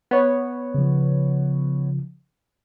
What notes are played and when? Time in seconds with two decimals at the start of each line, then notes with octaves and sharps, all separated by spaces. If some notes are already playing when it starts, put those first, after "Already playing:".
0.11 B3 C#5
0.74 C#3 F3